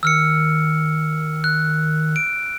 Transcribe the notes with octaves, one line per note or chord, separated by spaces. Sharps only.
D#3 E6 F6 C#7
F#6
D7